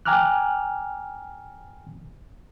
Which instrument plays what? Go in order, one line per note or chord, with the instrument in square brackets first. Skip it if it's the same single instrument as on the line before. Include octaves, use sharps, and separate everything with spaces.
[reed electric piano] G5 G#5 A#5 D6 F6 F#6